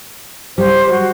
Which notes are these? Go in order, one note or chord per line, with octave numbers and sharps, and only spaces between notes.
G3 C5
F#4